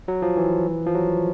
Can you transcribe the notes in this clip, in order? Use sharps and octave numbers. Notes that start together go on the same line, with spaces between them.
F#3
F3
E3
F3
F#3